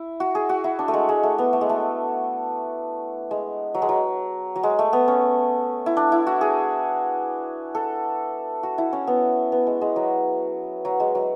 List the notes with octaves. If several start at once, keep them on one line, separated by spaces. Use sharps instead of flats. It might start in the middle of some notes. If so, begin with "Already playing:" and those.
Already playing: E4
F#4
G#4
F#4
E4
D4
A3
G#3
G#3
A3
B3
A3
G#3
A3
G#3
F#3
G#3
F#3
F#3
G#3
A3
B3
C#4
E4
D4
E4
F#4
G#4
A4
F#4
E4
C#4
B3
B3
G#3
G#3
F#3
F#3
G#3
F#3